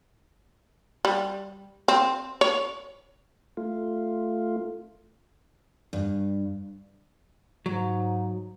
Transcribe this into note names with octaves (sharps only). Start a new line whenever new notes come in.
G3
C4
C#5
A3 F4
G2
G#2 F#3